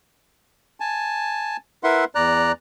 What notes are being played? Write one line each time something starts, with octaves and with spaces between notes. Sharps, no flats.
G#5 A5
E4 A#4 B4 E5 F#5 C6
E2 D5 A#5 F#6